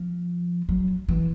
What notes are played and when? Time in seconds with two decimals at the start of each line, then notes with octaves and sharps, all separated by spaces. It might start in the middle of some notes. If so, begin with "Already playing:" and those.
Already playing: F3
0.69 F#3
1.09 E3